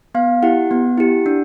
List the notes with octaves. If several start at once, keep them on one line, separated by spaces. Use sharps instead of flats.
B3 F5
E4 G4 F#5
B3
E4 G4
D4